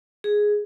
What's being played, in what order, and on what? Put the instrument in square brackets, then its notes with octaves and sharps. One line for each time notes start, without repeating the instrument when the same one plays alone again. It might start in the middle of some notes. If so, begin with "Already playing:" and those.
[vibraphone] G#4